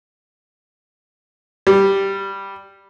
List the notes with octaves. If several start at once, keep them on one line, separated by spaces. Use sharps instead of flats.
G3